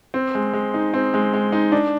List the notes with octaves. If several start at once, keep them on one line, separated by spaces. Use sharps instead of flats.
C4
G#3
G#3
D#4
C4
G#3
G#3
D#4
D4